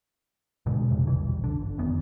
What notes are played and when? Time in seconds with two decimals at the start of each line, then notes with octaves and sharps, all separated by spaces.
0.66 G2 B2 D3 G#3
0.91 F2 C3
1.07 E1 A#1 E3 G3
1.44 D3
1.62 G1
1.78 G1 F2 D#3 B3